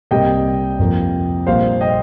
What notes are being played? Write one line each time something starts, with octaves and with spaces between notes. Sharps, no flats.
C2 C3 G3 A#3 D#5 G5
F2 F3 A#3
A#1 A#2 G3 A#3 C5 F5
D#5 G5